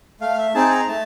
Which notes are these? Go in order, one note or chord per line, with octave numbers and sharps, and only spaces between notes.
A3 F5
E5
C4 D#4 G#4 A5
A#5
A3 A5